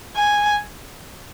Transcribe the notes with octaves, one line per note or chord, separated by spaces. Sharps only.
G#5